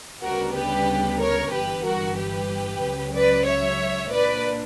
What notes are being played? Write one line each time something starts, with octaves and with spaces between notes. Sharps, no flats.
D2 C#3 G3 B3 D4 F#4 A#4
G4 B4
A#4 C#5
G1 G2 E3 G4 B4
F#4 A#4
G4 B4
C#2 C#3 F#3
B4 D5
C#5 E5
A#2 A#3 D4 B4 D5